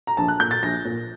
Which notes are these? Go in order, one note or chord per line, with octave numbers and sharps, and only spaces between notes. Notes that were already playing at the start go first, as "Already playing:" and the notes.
A#5
A#1 A5
F#6
A#2 G6
A6
A#1 A#6
A#2